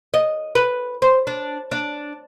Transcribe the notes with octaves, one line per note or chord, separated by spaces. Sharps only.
D#5
B4
C5
D4
D4